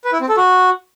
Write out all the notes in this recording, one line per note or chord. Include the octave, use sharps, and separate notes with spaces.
B4
E4
C4
A4
F#4